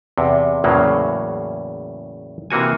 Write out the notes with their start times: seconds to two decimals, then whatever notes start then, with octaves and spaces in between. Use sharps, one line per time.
0.18 E2 C3
0.64 E2 A2 C#3 F#3 A#3
2.50 C3 E3 A#3 F#4 G#5